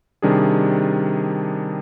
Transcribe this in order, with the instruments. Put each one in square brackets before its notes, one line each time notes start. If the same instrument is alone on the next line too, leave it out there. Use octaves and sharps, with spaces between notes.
[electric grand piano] C3 D#3 G3 D4 G#4